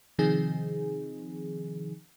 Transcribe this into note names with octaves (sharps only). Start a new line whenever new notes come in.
C3 D#3 F3 C4 D#4 G#4